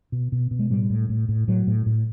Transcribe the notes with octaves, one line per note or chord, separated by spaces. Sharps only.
B2
B2
B2
G#3
A2 G3
A2
A2
A2
A2 F#3
A2
A2